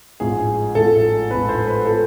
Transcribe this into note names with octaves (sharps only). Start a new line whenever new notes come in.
A1 G#2 F3 G#4
A1 G#2 F3 A4
A1 G#2 F3 B4
C5
B4
F3 A4